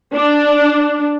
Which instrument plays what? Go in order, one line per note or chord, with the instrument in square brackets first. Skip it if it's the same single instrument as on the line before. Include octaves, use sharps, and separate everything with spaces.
[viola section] D4